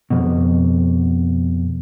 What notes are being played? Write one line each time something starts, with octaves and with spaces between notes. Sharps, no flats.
F2 B2